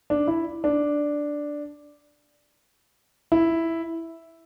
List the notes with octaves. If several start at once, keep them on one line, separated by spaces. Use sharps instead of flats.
D4
E4
D4
E4